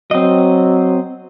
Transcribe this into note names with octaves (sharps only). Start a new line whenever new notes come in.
F#3 C4 D#5